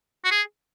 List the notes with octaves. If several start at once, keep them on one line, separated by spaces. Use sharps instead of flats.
F#4
G#4